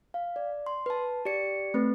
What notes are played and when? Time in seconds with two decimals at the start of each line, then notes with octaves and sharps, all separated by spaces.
0.14 F5
0.36 D5
0.66 C6
0.86 B4 A5
1.25 G4 D5 C#7
1.74 A3 C4 B4